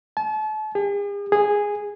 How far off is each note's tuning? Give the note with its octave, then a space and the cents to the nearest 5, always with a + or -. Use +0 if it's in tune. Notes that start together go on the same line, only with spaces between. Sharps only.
A5 -35
G#4 -45
G#4 -10